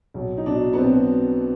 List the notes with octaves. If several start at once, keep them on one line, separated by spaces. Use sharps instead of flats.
B1
D#4
B2 D4
B3
B1 C4